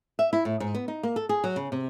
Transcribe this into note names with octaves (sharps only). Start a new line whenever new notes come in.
E5
E4
A2
G#2
B3
D#4
A#3
A4
G#4
F#3
C#3
C3